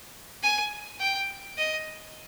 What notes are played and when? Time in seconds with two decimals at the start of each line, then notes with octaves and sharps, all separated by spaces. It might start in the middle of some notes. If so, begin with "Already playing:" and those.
0.43 G#5
1.00 G5
1.57 D#5